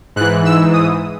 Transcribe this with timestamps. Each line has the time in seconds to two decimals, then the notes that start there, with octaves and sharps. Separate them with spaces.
0.16 G#2 F#6
0.21 E3
0.45 E6
0.73 D#6